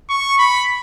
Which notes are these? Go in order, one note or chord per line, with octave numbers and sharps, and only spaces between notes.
C#6
B5